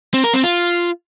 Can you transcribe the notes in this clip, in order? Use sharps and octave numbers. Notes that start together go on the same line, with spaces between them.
C4
A#4
C4
F4